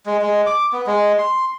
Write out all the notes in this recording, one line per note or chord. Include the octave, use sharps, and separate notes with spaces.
G#3
G#3
D6
B3
G#3
C6